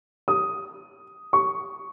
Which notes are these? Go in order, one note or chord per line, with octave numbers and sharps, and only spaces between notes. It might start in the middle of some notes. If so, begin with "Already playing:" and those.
D#6
C#6